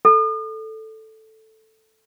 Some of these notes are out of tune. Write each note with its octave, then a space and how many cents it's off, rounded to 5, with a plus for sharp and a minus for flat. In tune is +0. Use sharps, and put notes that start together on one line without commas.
A4 +0